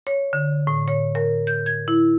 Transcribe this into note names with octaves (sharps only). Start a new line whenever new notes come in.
C#5
D3
A2
C#5
A#4
G6
G#6
E4